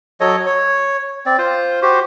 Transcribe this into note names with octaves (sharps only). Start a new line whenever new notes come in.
F#3 A4 C#5 D#5
C#5
C4 D5
F4 C5
F#4 G4 C5